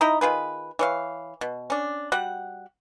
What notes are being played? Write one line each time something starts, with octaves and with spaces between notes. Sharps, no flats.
D#4 E4 D#5 A#5
D#3 F4 G#4 B4
E3 C#5 F5
B2
C#4 D4
G3 F#4 F#5